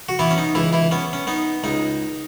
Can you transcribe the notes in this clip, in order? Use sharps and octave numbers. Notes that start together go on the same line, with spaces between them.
F#4
E3 B3 E4
C#4
D#4
C#2 E3 E4
E3 E4
B3 C#4
C#4
B3 D#4
C#2 D#4